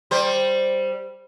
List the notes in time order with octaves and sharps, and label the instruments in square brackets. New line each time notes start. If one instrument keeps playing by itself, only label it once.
[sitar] G3 C5